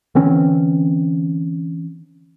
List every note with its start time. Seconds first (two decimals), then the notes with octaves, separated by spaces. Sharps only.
0.15 D3 E3 C4 C#4